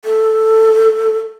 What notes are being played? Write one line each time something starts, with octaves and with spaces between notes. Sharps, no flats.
A4